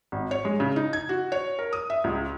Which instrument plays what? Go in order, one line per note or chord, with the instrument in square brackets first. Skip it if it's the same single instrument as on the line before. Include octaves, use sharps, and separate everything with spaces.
[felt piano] G#1
C#5
G#3
C#3
D#4
G#6
F#4
C#5
A#4
D#6
E5
C#2